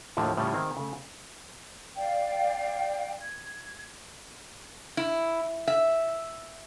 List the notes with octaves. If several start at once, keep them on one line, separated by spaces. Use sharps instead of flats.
D#2 A2 D3 F3 F#3
A2 C#3 F3 G3
D#3 C4 G#4 D#5
C#3 A3
D5 F5 G5
G#6
E4
E5